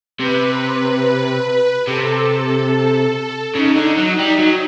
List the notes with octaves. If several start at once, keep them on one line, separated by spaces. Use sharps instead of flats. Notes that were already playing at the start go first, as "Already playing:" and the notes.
C3 B4
C3 A4
C#3 D#4
D3
F#3
G3
F#3